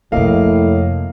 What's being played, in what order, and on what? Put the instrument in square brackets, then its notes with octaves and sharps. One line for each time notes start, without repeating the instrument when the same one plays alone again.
[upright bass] F2 C3 [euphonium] A2 [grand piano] A#3 D#5 F5